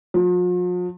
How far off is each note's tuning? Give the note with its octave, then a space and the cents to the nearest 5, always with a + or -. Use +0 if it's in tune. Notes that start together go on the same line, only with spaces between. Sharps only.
F3 +45